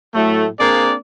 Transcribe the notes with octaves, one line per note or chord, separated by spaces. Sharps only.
A2 F#3 A3
A#3 C4 D4 G#4 D5